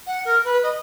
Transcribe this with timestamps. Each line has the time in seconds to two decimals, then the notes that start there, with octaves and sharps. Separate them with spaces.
0.06 F#5
0.25 A#4
0.44 B4
0.63 D#5